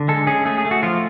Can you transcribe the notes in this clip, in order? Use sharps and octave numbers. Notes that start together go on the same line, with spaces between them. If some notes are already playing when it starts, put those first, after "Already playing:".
Already playing: D3
G#3 A4
C#4 G#4
A3 G#4
G#4
A3
F#4
F3 F4